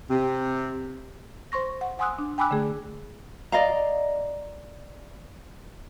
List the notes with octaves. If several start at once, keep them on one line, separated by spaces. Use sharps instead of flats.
C3
C5 C6 C#6 A#6
F#5
F#5 G#5 C6 D#6 E6 F#6
D4
G5 G#5 B5 D6 E6 F#6
D3 A3 G#4
D5 D#5 F5 A#5